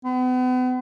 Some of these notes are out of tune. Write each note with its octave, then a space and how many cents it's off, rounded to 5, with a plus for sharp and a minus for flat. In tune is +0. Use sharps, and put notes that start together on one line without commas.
B3 +40